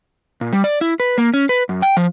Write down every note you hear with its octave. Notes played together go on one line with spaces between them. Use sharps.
A#2
G3
D5
E4
B4
A#3
C#4
B4
F#2
G5
F3